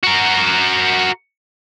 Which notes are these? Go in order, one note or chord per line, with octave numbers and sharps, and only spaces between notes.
F#4 A#4